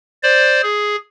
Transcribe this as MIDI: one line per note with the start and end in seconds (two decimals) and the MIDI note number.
0.23 0.62 72
0.23 0.62 74
0.63 0.96 68